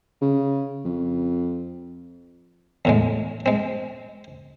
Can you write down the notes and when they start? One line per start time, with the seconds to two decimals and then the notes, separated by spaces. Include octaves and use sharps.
0.21 C#3
0.85 F2
2.85 E2 A2 G#3
3.46 G#3 C4